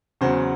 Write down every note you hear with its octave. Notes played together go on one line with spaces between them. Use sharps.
E2 C#3 F#3 C5